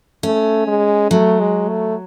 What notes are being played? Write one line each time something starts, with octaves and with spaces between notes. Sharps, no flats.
A3 C#4
G#3
F#3 A3
G#3
A3